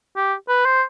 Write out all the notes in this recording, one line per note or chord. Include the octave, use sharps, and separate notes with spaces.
G4
B4
C5